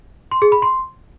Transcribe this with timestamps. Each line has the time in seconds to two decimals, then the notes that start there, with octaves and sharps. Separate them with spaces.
0.31 C6
0.42 G#4
0.52 B5
0.62 C6